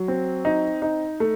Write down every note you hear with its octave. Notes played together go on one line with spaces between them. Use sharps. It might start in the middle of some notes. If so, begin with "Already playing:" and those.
Already playing: F#3
C4
D#4
D#4
A3